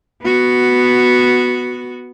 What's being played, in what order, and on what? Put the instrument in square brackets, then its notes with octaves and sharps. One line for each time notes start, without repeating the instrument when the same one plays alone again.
[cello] B3 F#4